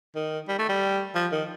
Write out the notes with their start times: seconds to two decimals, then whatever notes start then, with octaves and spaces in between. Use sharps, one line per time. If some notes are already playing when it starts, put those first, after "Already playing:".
0.16 D#3
0.48 G3
0.59 A3
0.69 G3
1.15 F3
1.32 D#3